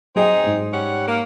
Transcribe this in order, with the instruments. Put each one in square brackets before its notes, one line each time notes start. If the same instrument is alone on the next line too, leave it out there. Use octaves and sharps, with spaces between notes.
[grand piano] F#3 D#5 G5 [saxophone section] C4 D#4 G#4
[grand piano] G#2 C5
[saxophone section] G3 C#4 F#5
A#3